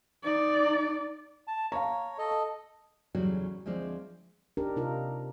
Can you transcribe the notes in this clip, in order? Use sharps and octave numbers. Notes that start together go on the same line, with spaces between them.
D#4 D5
A5
C#5 F5 A5 A#5
A4 D#5
E2 A2 C#3 F#3 G3 F#4
D2 F3 G#3 C4 D5
D4 D#4 G4 A#4
C3 D#4 F4 A#4